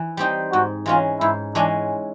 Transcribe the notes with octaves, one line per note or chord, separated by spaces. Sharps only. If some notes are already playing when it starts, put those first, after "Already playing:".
Already playing: E3
G3 C4 D#4 G4
G#2 F#4
E3 G#3 C#4 F4
G#2 E4
E3 G#3 C#4 D4